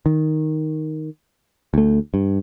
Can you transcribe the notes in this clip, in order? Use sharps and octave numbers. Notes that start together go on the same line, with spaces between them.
D#3
D2 A3
G2